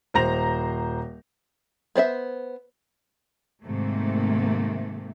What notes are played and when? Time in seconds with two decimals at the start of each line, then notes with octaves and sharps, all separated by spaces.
0.14 D#1 C5 A#5 A#6 F7
1.95 B3 C5 D5 E5
3.64 G#2 C3 D#3 A3 A#3